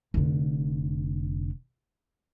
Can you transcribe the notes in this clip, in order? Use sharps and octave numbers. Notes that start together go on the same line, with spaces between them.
F1 D3